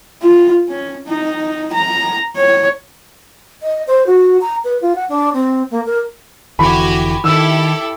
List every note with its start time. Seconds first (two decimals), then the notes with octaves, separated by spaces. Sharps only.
0.22 F4
0.69 C#4
1.07 D#4
1.73 A#5
2.36 C#5
3.63 D#5
3.87 C5
4.07 F#4
4.41 A#5
4.64 B4
4.82 F4
4.95 F#5
5.09 D4
5.33 C4
5.71 A#3
5.86 A#4
6.59 F1 D3 E3 F#4 G4 G#5 B5
7.24 D#3 E4 G4 A4 E6